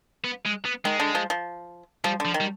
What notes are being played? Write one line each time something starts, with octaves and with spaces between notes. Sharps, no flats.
B3
G#3
B3
D#3 G#3
D3
F3
F3
F3 G3
D3
F3
D#3
G3